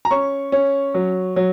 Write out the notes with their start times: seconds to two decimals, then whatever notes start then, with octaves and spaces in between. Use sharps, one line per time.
0.05 A#5
0.11 C#4 C#6
0.52 C#4
0.94 F#3
1.36 F#3